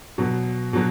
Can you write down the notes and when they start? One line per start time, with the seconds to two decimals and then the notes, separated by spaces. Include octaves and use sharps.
0.18 B2 F#3
0.73 B2 F#3